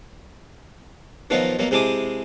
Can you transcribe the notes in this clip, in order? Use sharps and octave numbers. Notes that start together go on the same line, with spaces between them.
B2 D#3 F3 F#3 F4 F#4
B2 F#3 A#3
C3 G#3 E4 A5 D6 D#6